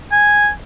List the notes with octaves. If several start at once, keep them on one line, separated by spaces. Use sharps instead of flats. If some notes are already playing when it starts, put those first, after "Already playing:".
G#5